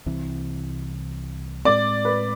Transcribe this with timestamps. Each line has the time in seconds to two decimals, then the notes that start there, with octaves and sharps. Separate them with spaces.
0.06 C2 C3 E3
1.65 A2 G#3 C4 D5
2.05 B4